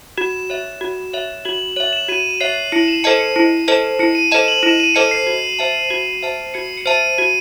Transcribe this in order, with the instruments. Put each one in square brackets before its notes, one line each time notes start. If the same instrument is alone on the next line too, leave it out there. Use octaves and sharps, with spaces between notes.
[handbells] F#4 [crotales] E7
[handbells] C#5 E5
F#4
C#5 E5
[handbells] F#4 [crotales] F#7
[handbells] C#5 E5 [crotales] F#7
[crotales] E7
[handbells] F#4 [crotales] D#7
[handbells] C#5 E5 [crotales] C7
[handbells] E4 [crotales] C#7
[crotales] E7
[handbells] A4 C5 D#5 A5 [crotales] C#7
[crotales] C#7
[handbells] E4
A4 C5 D#5 A5
[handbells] E4 [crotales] C#7
[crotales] D#7
[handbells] A4 C5 D#5 A5 [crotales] E7
[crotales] F#7
[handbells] E4 [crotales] E7
[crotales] D#7
[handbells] A4 C5 D#5 A5 [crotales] C#7
[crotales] C7
[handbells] F#4
C5 E5 A5
F#4
C5 E5 A5
[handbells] F#4 [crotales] C#7
[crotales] C#7
[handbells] C5 E5 A5 [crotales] D#7
[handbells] F#4 [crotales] D#7